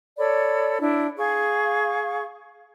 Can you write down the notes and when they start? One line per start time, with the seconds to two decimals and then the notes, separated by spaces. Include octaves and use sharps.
0.18 A4 C#5 D5 B5
0.80 D4 E4
1.18 G#4 F5 C#6